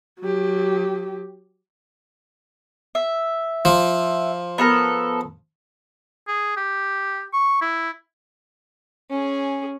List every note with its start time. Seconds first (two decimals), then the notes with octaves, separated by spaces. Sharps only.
0.20 F#3 G4
2.95 E5
3.65 F3
4.58 B3 A4 A#4
6.28 G#4
6.57 G4
7.33 C#6
7.61 E4
9.10 C#4 G#4